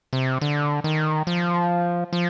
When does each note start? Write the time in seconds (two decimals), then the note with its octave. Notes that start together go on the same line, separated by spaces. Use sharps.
0.13 C3
0.41 D3
0.84 D#3
1.27 F3
2.13 F3